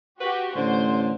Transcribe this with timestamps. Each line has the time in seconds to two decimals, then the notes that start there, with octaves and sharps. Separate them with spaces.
0.20 F#4 G4 B4
0.56 A1 D3 C5